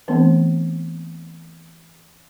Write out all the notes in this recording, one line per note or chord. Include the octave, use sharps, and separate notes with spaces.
E3 A3 B3 C4 D4 B4